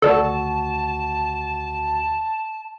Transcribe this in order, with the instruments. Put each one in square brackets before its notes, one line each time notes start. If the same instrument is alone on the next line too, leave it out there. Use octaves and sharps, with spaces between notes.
[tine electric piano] D2 F#4 [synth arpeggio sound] A4 D5 [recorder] A5